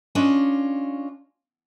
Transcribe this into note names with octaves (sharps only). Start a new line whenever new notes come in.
C#4 D4 F4 D#5